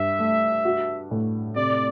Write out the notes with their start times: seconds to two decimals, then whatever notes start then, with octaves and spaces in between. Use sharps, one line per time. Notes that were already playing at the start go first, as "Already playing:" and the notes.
Already playing: G2 E5
0.19 A3
0.65 F#4
1.11 A2
1.56 C3 D5